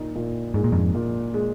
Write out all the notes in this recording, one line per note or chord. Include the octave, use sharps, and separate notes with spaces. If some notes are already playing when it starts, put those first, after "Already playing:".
Already playing: A#2 D#4
A#2
G#2 G#3
A#2
F2 G#2
A#2
G#3